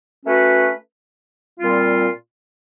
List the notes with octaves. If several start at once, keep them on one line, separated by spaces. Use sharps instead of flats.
A3 C#4 F#4 B4
A#2 G3 C4 F4